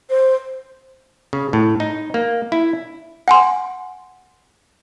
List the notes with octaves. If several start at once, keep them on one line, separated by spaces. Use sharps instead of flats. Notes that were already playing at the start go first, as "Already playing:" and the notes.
C5
C#3
A2
D#4
A#3
E4
F#5 G#5 C6